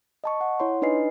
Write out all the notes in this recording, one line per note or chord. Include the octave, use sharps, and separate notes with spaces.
D#5 A5 C#6
F#5
E4 C#5 C6
D4 D#4 B4 D#5 G#5 C7